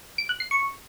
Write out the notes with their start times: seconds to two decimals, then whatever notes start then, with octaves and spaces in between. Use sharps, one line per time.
0.18 D7
0.29 F#6
0.40 C7
0.51 C#6